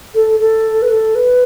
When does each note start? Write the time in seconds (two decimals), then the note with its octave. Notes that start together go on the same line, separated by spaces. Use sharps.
0.15 A4
0.40 A4
0.82 B4
0.90 A4
1.15 B4